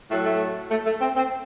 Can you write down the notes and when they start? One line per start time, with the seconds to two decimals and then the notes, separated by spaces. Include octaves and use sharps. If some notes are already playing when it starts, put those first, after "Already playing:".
0.11 A2 F#3 A3
0.26 A3
0.71 A3
0.86 A3
1.01 C4
1.16 C4